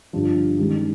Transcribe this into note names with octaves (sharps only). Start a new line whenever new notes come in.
G1 G2 F3
G2 D#3 G#3 C#4 G4